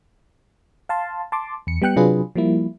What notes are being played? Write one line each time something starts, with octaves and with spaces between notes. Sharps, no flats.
F5 A5 C6
A5 C6 D6
E2 C#7
G3 B3 G5 F#6 C#7
C3 F#3 D4 F4 G#4 B4
F3 G3 A#3 E4